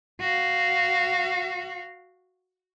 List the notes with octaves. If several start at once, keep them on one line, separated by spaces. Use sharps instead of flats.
F#4 F5